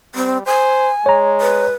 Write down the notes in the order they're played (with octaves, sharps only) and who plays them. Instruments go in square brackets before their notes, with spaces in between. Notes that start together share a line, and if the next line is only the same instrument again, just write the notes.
[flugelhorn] G3 [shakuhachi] C4
[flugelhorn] C5 [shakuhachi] G#5
[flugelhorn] G#3 [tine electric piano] C#5 A#5
[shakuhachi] B4